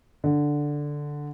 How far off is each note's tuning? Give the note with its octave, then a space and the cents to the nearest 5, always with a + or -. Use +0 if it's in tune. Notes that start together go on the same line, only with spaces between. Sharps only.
D3 +0